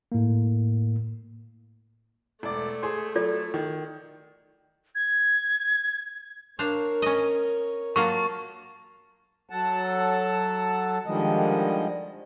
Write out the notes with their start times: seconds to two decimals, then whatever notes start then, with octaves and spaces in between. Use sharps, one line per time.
0.12 A2 A#3
2.43 E1 A3 D5
2.83 G#4 C5
3.15 F#3 F4 A4 D5
3.54 D#3
4.95 G#6
6.59 D4 A#4 C5 C#5 F5
7.02 C#4 D#5
7.96 F#3 A#3 F4 A5 C#6
9.50 F#3 A4 F#5 A5
11.06 D3 D#3 F3 G3 G#3 D#5